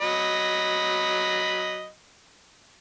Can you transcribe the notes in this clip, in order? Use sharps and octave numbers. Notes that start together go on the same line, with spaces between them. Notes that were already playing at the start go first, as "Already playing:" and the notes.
F#3 D#5 B5